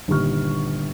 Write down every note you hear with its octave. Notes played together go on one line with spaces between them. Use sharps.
G1 A#2 D#3 G4 C#6 F6